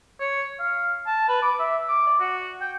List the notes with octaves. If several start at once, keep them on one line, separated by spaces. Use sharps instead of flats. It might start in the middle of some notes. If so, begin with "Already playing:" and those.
C#5
F5
A5
B4
D6
E5
D6
D5
F#4
G5